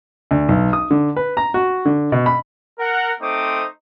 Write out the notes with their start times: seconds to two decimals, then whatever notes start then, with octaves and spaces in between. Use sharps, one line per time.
0.31 D2
0.49 B1
0.73 D#6
0.91 D3
1.16 B4
1.37 A#5
1.54 F#4
1.85 D3
2.12 B2
2.26 B5
2.80 A#4 F#5
3.20 A3 C4 D#4 C5 D6 D#6